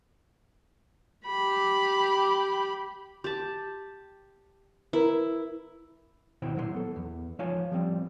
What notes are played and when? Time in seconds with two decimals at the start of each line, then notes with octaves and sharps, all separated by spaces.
1.26 G4 B5
3.24 G4 A5 C6
4.93 E4 A#4 B4 A#5
6.42 B2 D#3 E4 C5 G5
6.55 A#2 F#3 E4 D5 C6
6.74 B3 A4
6.96 E2
7.39 F3 D#4 F4 C#5 F5 G#5
7.72 F3 G3 C4